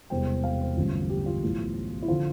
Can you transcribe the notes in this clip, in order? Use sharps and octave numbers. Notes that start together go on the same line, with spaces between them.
E1 E2 C3 G3 C4 G5
F5
C5
A1 G2 D3 F3
G4
F4
B1 A2 E3
E4
D3 F3 F4